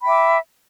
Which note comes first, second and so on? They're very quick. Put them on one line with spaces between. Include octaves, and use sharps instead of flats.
B5 G5 E5 D6